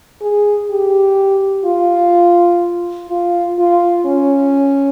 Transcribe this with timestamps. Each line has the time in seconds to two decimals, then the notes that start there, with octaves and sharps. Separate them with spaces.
0.22 G#4
0.70 G4
1.66 F4
3.10 F4
3.59 F4
4.06 C#4